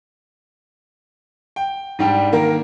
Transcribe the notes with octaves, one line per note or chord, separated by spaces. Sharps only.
G5
G#2 G3 D4 G4
D#3 A#3 A#4